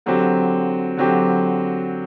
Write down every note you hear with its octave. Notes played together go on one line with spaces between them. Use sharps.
D3 F#3 C4 G4
D3 F#3 C4 G4